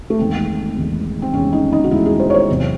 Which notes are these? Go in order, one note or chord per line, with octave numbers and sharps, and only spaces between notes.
A3
E2 D#3 G#3 C4
E2 D#3 G#3
C4
E2 D#3 G#3 C#4
D#4
D#4
F#4
E2 D#3 G#3 E4
G#4
C5
C#5
C5
E2 C3 F#3